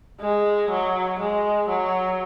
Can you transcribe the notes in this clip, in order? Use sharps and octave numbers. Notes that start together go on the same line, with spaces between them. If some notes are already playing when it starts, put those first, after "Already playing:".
G#3
F#3
G#3
F#3